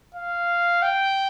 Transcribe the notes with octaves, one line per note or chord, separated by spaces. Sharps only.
F5
G5